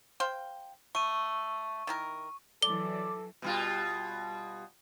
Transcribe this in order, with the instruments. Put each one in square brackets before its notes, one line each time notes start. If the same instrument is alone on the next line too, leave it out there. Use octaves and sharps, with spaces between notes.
[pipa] C5 F5 G5
[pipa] A3 [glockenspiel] C#6 D#7
[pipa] D#3 E4 A#4
[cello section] E3 F#3 [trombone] A4 [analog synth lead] D5 [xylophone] G7
[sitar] B2 G3 F4